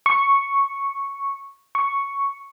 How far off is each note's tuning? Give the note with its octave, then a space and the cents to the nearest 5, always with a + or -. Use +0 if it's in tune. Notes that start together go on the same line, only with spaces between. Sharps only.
C#6 -5
C#6 +0